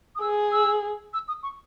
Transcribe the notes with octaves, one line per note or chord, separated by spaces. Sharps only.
D#6
G#4 E6
E6
E6
D#6
C#6